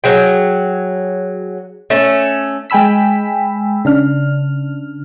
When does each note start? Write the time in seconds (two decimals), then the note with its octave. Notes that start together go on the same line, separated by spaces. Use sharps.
0.04 F#3 G#4 G5
1.90 A3 C#4
2.70 G#3 G5 G#5 B5 E6 B6
3.85 C#3 D4 F6